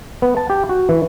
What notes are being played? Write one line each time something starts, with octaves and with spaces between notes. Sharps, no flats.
B3
A5
G4
F#4
E3